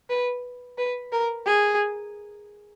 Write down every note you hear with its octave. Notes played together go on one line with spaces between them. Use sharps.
B4
B4
A#4
G#4